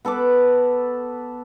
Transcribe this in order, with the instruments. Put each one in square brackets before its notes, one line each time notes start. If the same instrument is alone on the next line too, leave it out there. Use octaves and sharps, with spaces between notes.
[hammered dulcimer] B3 A4 B4 D6